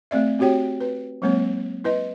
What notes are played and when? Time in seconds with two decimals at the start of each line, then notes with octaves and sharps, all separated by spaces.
0.11 A3 C4 D5 E5
0.39 C4 F#4 G4 C#5 G5
0.81 B4
1.22 F#3 G#3 A#3 C4 C#5
1.84 E4 B4 D#5